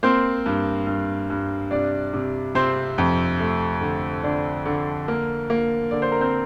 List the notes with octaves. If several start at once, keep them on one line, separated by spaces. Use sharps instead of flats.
A#3 C4 C5
G2
G2
G2
C3 D4 D5
C3
C3 C4 C5
F2
A3
D3
D3 D4 D5
D3
A#3
A#3
D3 D5
C5
A#4
C4 C5